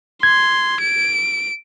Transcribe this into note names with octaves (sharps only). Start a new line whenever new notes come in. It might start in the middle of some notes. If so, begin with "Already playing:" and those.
C6 G#6
D7